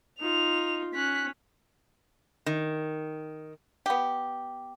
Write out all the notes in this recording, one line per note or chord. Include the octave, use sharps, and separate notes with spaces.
D#4 F4 F7
C#4 F#6 B6
D#3
B3 G4